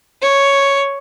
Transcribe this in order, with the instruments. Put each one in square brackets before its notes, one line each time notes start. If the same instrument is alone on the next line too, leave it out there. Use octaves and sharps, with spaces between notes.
[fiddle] C#5